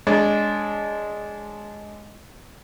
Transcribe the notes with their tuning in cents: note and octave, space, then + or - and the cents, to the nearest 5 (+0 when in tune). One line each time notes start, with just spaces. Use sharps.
G#3 +0 D4 -15 C#5 +0